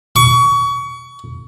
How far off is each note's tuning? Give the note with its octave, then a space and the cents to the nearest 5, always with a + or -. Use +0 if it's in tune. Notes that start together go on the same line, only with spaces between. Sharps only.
C#6 +30